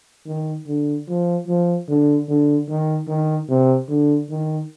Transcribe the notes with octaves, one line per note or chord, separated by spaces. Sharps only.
D#3
D3
F3
F3
D3
D3
D#3
D#3
C3
D3
D#3